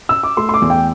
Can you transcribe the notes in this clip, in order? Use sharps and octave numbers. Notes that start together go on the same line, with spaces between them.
E6
D6
A3 C6
C6
D6
E2
G5